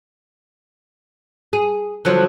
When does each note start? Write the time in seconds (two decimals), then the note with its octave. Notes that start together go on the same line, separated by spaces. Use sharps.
1.53 G#4
2.05 D3 F3 F#3